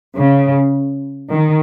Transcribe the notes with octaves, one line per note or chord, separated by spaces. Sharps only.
C#3
D#3